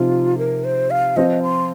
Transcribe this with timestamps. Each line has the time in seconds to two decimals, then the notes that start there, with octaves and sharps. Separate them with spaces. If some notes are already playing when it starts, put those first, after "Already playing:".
Already playing: C3 F3 C4 D#4 F4
0.38 A#4
0.64 C5
0.91 F5
1.16 F3 C4 F4 D#5
1.43 C6